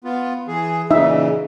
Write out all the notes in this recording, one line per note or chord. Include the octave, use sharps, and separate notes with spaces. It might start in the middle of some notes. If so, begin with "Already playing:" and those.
B3 F4
E3 G#4
A#2 C#3 E3 D#4 D#5 E5